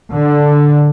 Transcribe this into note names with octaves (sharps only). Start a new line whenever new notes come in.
D3